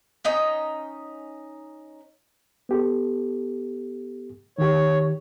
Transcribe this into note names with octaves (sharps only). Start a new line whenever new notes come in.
C#4 D#4 D#5 G5
B3 G4 A4
D#3 G4 C#5